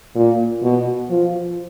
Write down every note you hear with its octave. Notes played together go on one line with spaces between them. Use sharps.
A#2
B2
F3